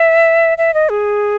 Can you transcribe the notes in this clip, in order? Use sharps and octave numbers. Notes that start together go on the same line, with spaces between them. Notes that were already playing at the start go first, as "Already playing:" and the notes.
Already playing: E5
E5
D#5
G#4